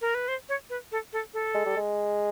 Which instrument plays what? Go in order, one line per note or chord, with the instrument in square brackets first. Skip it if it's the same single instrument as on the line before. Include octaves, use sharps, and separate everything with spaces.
[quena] A#4
B4
C5
C#5
B4
A4
A4
A4
[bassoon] G#3
G3
G#3